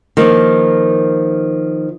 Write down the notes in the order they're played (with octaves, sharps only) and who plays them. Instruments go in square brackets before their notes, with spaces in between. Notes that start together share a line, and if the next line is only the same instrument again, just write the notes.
[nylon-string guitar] D#3 F3 A#3